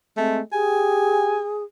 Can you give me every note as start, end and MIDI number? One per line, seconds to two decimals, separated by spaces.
0.17 0.41 56
0.17 0.41 57
0.17 0.40 60
0.53 1.41 67
0.53 1.64 68
0.53 1.57 80